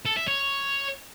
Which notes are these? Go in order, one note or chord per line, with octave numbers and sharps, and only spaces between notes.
A4
E5
C#5